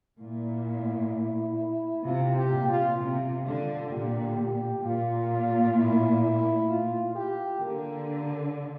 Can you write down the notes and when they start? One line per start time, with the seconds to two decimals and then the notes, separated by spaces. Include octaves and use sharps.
0.20 A#2 E4
2.05 C3 F4
2.36 G4
2.52 A#2
2.68 F4
2.98 C3 F4
3.45 D3
3.91 A#2 G4
4.38 G4
4.84 A#2 F4
5.77 E4
6.22 E4
6.69 F4
7.15 G4
7.61 D3 A#3